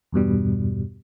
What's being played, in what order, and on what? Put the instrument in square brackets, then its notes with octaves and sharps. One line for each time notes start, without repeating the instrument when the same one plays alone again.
[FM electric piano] E2 G2 B2 G3